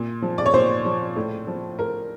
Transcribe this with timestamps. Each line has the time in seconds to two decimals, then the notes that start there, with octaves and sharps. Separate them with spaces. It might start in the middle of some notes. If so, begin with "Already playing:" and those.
Already playing: A#2
0.22 F3
0.38 D5
0.46 C#5
0.54 A#2 C5
0.85 F3
1.16 A2
1.47 F3
1.78 A2 A#4